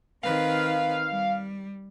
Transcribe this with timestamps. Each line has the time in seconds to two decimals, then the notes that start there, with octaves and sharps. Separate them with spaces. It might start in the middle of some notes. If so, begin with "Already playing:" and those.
0.23 D#3 C4 B4 F5
1.08 G3